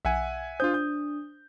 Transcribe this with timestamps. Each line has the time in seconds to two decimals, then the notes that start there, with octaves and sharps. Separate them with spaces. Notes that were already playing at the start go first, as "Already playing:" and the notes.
0.05 B1 E5 F#5 G#5
0.60 D4 F4 C5 D#6 G6
0.74 G6